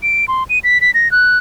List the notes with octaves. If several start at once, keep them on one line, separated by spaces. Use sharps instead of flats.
D7
C6
D#7
B6
B6
A#6
F#6